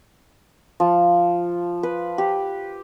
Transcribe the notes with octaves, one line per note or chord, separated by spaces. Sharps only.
F3
B4
G4